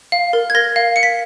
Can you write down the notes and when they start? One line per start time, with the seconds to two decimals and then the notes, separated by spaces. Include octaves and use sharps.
0.12 F5
0.33 A#4
0.50 G#6
0.55 A#4 A#6
0.76 F5
0.96 F5 C#7
1.03 B6